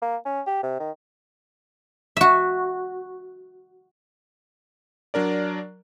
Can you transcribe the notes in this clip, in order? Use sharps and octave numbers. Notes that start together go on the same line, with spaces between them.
A#3
C#4
G4
C3
D#3
F#4 E5
F#3 D4 A#4 D5